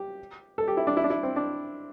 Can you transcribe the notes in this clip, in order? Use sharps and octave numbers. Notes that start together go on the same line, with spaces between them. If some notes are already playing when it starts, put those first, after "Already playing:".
Already playing: G4
A4
G4
E4
D4
E4
D4
E4
C4
D4